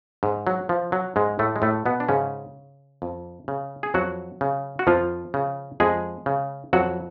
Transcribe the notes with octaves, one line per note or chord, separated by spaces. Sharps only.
G#2
F#3
F3
F#3
G#2 G#3
A2 A3
G#3
A2 A3
B2 B3
D4
G#2 C#3 C#4
F2
C#3
G#4
F2 F#3 F#4
C#3
F#4
F2 F3 F4
C#3
F2 G#3 G#4
C#3
F2 F#3 F#4